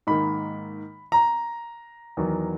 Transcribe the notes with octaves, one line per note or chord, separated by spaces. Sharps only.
G#2 D#3 A#3 B5
A#5
E2 D#3 F#3